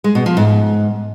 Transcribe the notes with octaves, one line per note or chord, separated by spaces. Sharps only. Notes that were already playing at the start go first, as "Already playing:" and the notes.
G#3
B2
F3
G#2